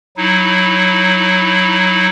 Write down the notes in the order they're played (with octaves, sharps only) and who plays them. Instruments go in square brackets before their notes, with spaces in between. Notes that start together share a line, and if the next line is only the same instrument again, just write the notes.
[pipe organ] F#3 D#4 E4